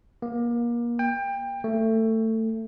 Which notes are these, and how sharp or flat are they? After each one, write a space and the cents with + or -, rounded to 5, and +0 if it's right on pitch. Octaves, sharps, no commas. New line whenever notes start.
A#3 +30
G5 +25
A3 +20